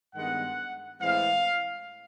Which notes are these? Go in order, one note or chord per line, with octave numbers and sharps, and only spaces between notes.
G2 D#3 G#3 B3 F#5
A2 E3 G#3 C4 F5